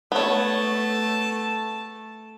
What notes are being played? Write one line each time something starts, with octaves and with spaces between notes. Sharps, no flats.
A3 B3 C#5 A5